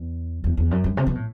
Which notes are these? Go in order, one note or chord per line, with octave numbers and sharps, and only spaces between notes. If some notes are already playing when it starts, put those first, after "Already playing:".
Already playing: E2
E2
E2
F#2
G2
C3
B2
A2